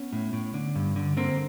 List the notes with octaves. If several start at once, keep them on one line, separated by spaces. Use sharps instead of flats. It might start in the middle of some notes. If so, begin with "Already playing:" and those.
Already playing: B3 C#4
A2
A2
D3
G2
D3
D3 A#3 C4